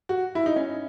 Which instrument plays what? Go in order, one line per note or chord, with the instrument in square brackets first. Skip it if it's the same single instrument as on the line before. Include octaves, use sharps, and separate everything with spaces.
[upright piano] F#4
E4
D#4
C#4